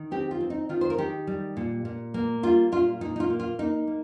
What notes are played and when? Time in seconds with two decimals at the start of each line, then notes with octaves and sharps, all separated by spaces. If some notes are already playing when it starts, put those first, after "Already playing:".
Already playing: D#3
0.11 C4 G4
0.31 F4
0.41 C4
0.50 D#4
0.69 D#3 F4
0.81 C5
0.90 A#4
0.98 D#3 G4
1.27 G3
1.57 A#2
1.85 A#2
2.14 A#3
2.43 G3 F4
2.72 A#2 F4
3.01 A#2 D#4
3.16 D#4
3.20 F4
3.30 A#3
3.40 F4
3.59 A#3 D#4
3.87 A#3